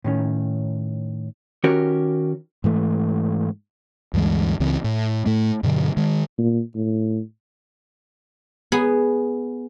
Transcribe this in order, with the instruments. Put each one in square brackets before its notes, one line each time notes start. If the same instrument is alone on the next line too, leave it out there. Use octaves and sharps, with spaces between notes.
[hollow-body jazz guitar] A2 D#3 C#4
D#3 C#4 F#4 G4 A#4 C#5
[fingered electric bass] G#2 E3 A3
D2 G2 E3 G#3
C#2 C#3 E3 C4
A2
A2 A3
G2 B2 D3 F#3
D#3 G#3
[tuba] A#2
A2
[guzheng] B3 G#4